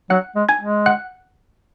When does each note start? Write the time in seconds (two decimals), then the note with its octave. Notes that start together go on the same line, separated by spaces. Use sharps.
0.10 F#3 F#5 F#6
0.35 G#3
0.49 G#5 G#6
0.61 G#3
0.86 F#5 F#6